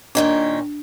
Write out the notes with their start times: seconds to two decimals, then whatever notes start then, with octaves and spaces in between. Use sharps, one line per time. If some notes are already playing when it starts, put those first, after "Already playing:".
0.15 A#2 D#3 C#4 D4